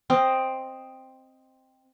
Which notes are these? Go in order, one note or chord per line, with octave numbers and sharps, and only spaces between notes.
C4 D#5